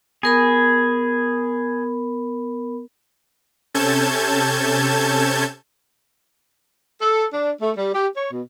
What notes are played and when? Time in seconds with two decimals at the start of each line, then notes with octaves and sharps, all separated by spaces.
0.23 B3 G#4 A#4 B5
3.74 C3 C#4 A4 A5 G6 G#6
7.00 A4
7.33 D4
7.61 A3
7.77 G3
7.94 G4
8.16 C#5
8.32 B2